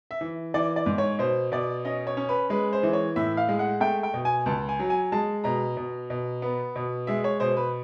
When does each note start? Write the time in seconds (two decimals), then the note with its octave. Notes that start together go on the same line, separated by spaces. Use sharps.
0.11 E5
0.21 E3
0.54 E3 D5
0.76 D5
0.86 G#2
0.98 C#5
1.19 B2 C5
1.52 B2 D5
1.85 C#4 D#5
2.07 C#5
2.17 C#4
2.29 B4
2.50 G#3 B4
2.73 C5
2.83 E3
2.93 C#5
3.16 A2 E5
3.37 F5
3.49 G#3
3.59 F#5
3.80 A3 G5
4.03 G5
4.14 B2
4.25 G#5
4.46 C#2 A5
4.69 G#5
4.79 F#3
4.90 G#5
5.12 G#3 A5
5.44 B2 A#5
5.77 B2
6.10 B2
6.42 B3
6.76 B2
7.07 G#3 E5
7.24 C#5
7.40 B2 C5
7.57 B4